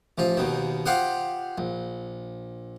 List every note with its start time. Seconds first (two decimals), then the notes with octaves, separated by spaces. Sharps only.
0.18 A1 F3 F4
0.37 D#2 B2 D#3
0.86 F4 G4 C5 F5 F#5 D#6
1.58 A#1